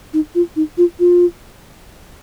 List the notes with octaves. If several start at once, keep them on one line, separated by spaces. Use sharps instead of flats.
D#4
F4
D#4
F4
F4